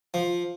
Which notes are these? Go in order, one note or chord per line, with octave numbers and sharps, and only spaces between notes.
F3